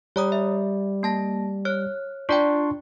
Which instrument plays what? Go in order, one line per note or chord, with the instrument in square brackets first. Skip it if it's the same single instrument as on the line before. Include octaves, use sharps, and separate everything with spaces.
[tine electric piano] G3 [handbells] C#5 A#5 D#6
[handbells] E5
A#3 A5 A#6
C#5 F6 F#6
[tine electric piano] D4 C6 C#6 [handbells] F4 D5 G5